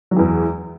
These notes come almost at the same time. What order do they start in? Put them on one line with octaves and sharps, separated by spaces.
F#3 G#3 E3 E2